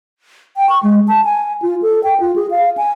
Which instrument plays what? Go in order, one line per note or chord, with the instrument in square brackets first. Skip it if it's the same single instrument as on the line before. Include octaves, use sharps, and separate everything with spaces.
[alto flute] G5
C#6
G#3
A5
G#5
F4
A4
G5
F4
G#4
F5
G#5